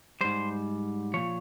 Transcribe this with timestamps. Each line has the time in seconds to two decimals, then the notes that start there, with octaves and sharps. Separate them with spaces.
0.21 G#2 G3 C5
1.14 A#2 F3 C#5